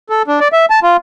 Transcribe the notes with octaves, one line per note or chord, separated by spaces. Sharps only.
A4
D4
D5
E5
A5
F4